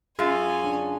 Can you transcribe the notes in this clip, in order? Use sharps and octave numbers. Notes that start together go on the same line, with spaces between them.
F#2 C#4 F4 G#4 G#5
D4